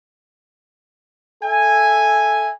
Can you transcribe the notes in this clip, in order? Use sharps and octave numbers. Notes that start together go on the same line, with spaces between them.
A4 E5 G#5